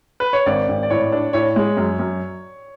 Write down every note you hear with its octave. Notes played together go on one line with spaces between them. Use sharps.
B4
C#5
G#1 D5
G#1
D5
A2 C#5
D4
A2 C#5
G#3
F#2
F#2